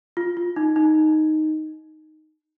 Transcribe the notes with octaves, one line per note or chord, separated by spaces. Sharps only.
F4
F4
D#4
D#4